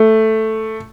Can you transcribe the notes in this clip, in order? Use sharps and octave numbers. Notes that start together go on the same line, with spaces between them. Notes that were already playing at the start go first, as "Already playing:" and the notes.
Already playing: A3